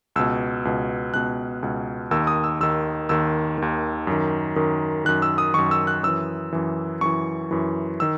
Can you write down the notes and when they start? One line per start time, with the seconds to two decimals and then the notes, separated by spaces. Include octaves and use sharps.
0.16 C#2 B2 E6
0.65 C#2 B2
1.13 C#2 B2 F#6
1.63 C#2 B2
2.11 D#2 D#3 E6
2.27 D#6
2.44 E6
2.60 D#2 D#3 E6
3.09 D#2 D#3 E6
3.58 D#2 D#3
4.07 F#2 D#3
4.56 F#2 D#3
5.05 F#2 D#3 F#6
5.22 E6
5.38 D#6
5.54 F#2 D#3 C#6
5.71 E6
5.87 F#6
6.03 F#2 E3 E6
6.53 F#2 E3
7.01 F#2 E3 C#6
7.51 F#2 E3
8.00 D#3 E6